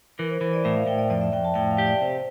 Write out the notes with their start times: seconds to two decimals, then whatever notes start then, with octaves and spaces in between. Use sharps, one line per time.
0.19 E3 A#4
0.30 C5
0.41 E3 C5
0.53 D5
0.64 A2 E5
0.76 F5
0.87 A2 G5
0.98 D5
1.10 F2 D5
1.21 E5
1.33 F2 G5
1.44 A5
1.55 A2 G5
1.71 F5
1.78 G4
1.87 D5
2.01 C3 C5